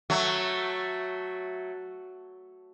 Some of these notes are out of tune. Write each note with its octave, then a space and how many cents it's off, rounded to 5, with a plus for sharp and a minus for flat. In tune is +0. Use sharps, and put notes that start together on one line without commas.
F#3 +0 A3 +0